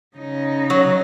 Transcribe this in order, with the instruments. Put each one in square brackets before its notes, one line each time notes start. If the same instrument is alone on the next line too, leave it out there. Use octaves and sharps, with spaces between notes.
[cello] C#3 D#4
[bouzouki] F#3